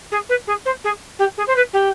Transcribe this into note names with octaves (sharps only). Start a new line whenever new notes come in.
G#4
B4
G#4
C5
G#4
G4
G#4
C5
B4
G4